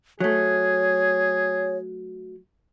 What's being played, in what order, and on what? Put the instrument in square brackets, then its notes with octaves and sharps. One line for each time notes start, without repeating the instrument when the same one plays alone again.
[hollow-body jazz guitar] F#3 A3 [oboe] G#4 [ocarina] C#5